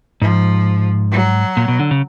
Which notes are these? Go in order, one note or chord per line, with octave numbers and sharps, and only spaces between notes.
G#2 F3
F#3
A#2
B2
D3
C#3